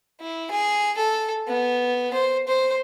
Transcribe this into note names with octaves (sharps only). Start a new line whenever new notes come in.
E4
G#4
A4
B3
C5
C5